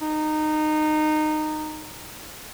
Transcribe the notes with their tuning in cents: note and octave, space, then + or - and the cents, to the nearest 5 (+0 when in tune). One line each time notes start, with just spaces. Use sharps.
D#4 -20